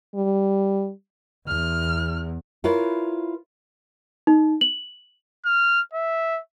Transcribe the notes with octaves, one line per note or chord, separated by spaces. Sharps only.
G3
E2 F6
E4 F4 A#4 B4 C#5
D#4
F#7
F6
E5